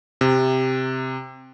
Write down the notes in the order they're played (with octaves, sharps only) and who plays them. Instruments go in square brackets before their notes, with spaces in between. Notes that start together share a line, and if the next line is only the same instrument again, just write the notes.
[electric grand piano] C3